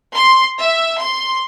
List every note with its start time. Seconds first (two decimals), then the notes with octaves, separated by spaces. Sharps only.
0.15 C6
0.59 E5
0.99 C6